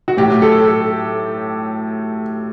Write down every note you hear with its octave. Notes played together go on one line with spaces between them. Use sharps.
F#4
A2 F#3 G4
A4
A4